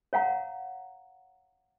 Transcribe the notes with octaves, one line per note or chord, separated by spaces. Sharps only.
C#5 F5 F#5 A#5